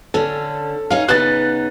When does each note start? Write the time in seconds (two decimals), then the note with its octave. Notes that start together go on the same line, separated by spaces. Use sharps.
0.14 D3 C#4 A4
0.90 C#4 D#4 F5
1.08 C#3 B3 D#4 F#6 A6